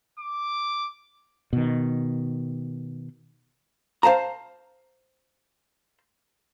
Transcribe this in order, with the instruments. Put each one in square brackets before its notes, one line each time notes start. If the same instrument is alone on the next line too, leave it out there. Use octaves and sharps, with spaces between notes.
[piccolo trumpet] D6
[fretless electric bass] B2 D#3
[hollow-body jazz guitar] C5 F5 A5 A#5